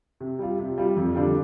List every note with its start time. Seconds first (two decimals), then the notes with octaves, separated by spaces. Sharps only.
0.20 C3
0.39 G3 F4
0.59 C3
0.78 G3 F4
0.96 F2
1.15 D3 G3 D4 F4